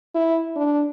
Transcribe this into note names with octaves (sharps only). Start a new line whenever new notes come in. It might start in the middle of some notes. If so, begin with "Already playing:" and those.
E4
D4